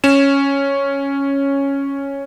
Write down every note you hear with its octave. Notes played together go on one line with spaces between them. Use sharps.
C#4 E7